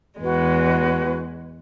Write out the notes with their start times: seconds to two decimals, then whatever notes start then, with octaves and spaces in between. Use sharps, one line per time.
0.21 E2 G#3 F#4 B4